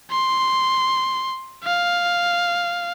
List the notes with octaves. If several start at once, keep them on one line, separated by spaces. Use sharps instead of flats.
C6
F5